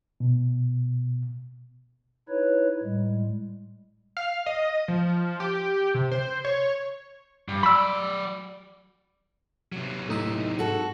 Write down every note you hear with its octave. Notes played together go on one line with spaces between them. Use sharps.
B2
D#4 E4 B4 C#5
A2 G3 G#3
F5
D#5
F3
G4
C3
C5
C#5
G2
F#3 D5 B5 E6
C3 F#3
A2 D#4 E5
G#2 F#4 A4